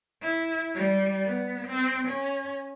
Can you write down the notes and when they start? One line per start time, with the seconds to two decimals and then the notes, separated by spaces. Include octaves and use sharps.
0.22 E4
0.75 G3
1.26 B3
1.68 C4
2.08 C#4